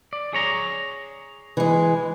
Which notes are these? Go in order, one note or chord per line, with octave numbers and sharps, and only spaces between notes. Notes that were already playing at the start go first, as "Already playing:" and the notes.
D5
G#4 C#5 A#5
E3 G#3